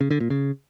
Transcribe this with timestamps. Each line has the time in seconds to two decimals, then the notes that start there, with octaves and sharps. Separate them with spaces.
0.01 C#3
0.11 D3
0.20 A#2
0.30 C#3